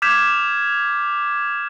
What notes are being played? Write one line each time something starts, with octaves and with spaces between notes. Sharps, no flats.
D6 F6 G6 G#6 B6 E7